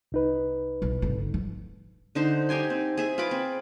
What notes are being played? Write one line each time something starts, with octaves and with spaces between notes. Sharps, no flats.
C2 D#4 B4
B1
G#1 D3
F3
D3 D#4 C5
D#4 G4 G#5 C6
C4
G#4 E5
F4 B4 B5 D6
C4